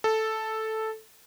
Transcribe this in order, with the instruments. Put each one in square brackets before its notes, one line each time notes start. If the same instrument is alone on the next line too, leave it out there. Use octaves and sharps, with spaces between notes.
[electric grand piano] A4